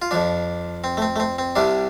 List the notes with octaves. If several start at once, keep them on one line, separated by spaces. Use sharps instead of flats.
F4
F2 F3 D4
C4
A3
C4
A3
C4
C4
C2 C3 G3 D4